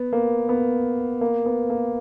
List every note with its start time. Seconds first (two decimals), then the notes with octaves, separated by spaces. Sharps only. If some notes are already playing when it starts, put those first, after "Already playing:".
Already playing: B3
0.13 A#3
0.49 B3
1.21 A#3
1.46 B3
1.70 A#3